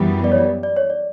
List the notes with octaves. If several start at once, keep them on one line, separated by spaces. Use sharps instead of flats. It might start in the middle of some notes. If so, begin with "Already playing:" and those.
Already playing: F#2 E3 G3 B3
D5
C#5
D5
D5
C#5
D5